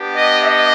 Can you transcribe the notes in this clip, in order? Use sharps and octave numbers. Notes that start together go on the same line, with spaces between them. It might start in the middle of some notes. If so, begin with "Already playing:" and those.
Already playing: B3 D4 G4
D#5
D#5